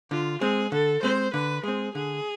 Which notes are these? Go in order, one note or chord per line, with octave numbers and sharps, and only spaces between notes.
D3 F4
G#3 C4 G#4
D3 A4
G#3 C4 C5
D3 B4
G#3 C4 G#4
D3 G#4